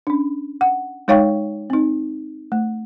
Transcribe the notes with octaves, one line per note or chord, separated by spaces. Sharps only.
C#4 D4
F#5
G#3 D#4 C#5 F5 G5 C#6
C4 D#4
A3